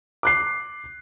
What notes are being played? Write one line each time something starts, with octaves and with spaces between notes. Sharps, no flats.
D6 F#6 C7